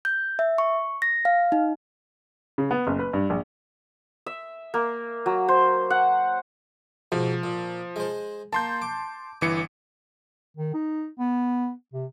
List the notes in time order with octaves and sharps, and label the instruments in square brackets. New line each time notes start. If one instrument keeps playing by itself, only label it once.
[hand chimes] G6
E5
C#6
A#6
F5
D#4
[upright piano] C#3
B3
F#1
B4
G2
A#1
[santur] E5
A#3
F#3
C5
F#5
[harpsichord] G#2 B2 [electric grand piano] F3
[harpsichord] A#2
G#3 C5
[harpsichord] A#3 [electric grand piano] A5 C6 G6
[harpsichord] D6
[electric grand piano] G1 E3 C#7 [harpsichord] D6
[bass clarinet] D#3
D#4
B3
C3